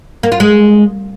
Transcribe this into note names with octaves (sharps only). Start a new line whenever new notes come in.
A#3
F4
G#3